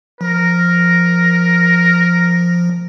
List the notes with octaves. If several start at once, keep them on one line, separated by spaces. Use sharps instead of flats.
F3 A#4